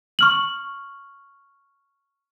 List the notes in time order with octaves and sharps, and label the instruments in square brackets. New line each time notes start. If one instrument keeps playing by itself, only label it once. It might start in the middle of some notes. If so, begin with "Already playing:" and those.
[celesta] C#6 F6 F#7